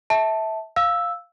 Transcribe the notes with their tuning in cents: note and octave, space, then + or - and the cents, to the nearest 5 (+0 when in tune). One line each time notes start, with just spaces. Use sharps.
E5 -20 A5 +0
F5 +0 E6 +0